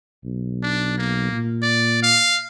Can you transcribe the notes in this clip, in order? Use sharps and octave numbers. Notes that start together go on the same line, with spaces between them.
B1
D4
A#3
A#2
D5
F5